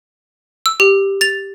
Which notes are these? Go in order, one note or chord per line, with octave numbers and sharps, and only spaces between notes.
E6
G4
A6 F7